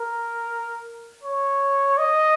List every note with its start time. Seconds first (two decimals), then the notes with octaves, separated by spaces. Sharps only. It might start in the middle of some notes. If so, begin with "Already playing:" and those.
Already playing: A#4
1.24 C#5
1.98 D#5